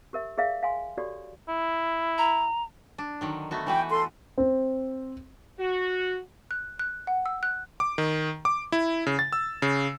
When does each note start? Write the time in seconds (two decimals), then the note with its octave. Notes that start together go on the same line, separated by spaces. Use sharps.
0.13 G4 A#4 E5
0.38 G#4 A#4 D5 E5 F5
0.63 F5 G5 G#5 C6
0.97 F#4 G4 A4 C#5 D5
1.48 E4
2.18 A#5
2.98 D4
3.21 D3 D#3 F#3
3.51 A3 B3 F#4
3.67 E3 F#4 B4 G5
3.89 A4 C6
4.38 C4
5.59 F#4
6.51 F#6
6.79 F#6
7.07 F#5
7.26 E6
7.43 F#6
7.80 D6
7.98 D#3
8.45 D6
8.72 E4
9.06 C#3
9.19 A6
9.33 E6
9.62 C#3